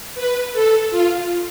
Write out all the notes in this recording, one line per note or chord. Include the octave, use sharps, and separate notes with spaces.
B4
A4
F4